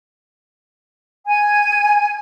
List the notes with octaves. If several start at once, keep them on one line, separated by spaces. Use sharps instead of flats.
G#5 G#6